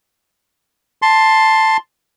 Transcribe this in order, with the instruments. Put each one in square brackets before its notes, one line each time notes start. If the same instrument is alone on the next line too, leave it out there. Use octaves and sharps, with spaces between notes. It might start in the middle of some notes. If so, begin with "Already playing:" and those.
[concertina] A5 C6